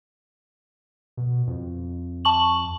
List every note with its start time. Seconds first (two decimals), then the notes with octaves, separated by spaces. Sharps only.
1.17 B2
1.47 F2
2.25 A5 C#6 F#7